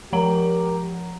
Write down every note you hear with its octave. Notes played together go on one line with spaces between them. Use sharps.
F3 G4 A#4 F#5 A#5